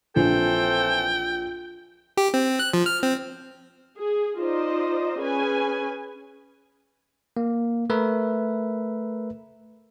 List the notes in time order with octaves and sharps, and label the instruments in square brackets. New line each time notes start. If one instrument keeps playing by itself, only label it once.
[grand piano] A#1 [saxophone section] E3 C4 A4 [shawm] G5
[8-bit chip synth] G4
C4
F#6
F3
F6
C4
[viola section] G#4
D#4 F4 C5 D5 D#5
C#4 G#4 B4 G#5
[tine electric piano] A#3
A3 A#4 B4 E5